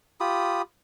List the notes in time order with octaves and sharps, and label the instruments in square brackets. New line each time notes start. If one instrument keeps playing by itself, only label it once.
[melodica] F4 G4 B5 D#6